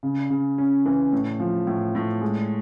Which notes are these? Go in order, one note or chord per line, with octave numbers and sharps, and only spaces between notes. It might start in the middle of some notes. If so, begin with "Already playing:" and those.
C#3
C#3
C#4
E3
A2
F3
A2
A2
G#3